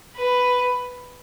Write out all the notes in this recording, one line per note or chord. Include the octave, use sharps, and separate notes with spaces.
B4